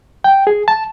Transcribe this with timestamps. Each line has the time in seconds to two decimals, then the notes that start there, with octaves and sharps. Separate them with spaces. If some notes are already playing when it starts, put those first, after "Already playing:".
0.24 G5
0.47 G#4
0.68 A5